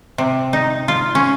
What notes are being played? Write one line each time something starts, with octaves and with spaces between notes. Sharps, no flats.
C3
D#4
F4
C#4